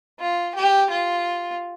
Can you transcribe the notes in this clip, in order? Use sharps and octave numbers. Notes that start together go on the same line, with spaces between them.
F4
G4
F4